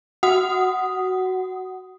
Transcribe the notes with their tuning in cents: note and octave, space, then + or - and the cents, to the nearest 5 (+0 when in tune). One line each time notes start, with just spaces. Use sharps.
F#4 +5 F#5 +15 D#6 +0